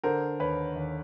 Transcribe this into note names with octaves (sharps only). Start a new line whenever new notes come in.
D3 A#4 C5
D#2 B4 C#5
D#2